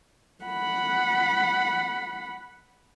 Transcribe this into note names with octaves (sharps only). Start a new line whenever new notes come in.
F#5 B5